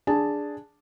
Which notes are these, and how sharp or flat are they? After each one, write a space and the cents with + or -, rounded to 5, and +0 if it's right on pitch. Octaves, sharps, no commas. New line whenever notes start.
D4 +0 G#4 +0 A5 +0